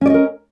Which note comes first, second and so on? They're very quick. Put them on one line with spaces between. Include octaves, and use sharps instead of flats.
C#4 D5 D#5 A#4